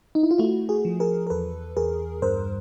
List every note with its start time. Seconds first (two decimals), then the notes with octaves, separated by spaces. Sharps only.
0.15 D#4
0.23 E4
0.31 F4
0.38 A3 E4 F#4
0.69 F#4 G#4
0.85 F3
1.00 G#4 A#4
1.27 A#4
1.30 E2 A4 B4
1.77 E2 G#4 A#4
2.22 G2 A#4 C5